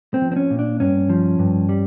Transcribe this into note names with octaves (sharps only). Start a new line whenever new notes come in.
C4
F3
C4
C#4
A#2
D4
G2 C#4
F3
G2
G3